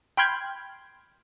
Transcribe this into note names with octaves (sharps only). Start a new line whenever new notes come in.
G5 B5 C6 F6 G6 G#6